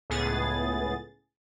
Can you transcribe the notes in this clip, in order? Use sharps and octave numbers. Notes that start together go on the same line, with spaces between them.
C#2 A2 B3 G#4 A6